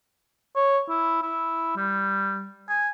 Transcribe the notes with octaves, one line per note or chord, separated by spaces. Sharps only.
C#5
E4
E4
G3
G#5